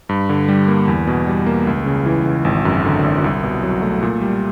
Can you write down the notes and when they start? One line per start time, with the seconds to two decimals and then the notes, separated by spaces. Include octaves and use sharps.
0.09 G2
0.29 D3
0.48 G3
0.68 A#3
0.88 E2
1.07 B2
1.27 G3
1.46 A#3
1.67 C#2
1.86 C#3
2.06 E3
2.25 C#2
2.45 G#1
2.65 F#2
2.85 D3
3.04 G#1
3.24 C2
3.43 B2
3.63 F#3
3.82 A3
4.03 A#2
4.21 G3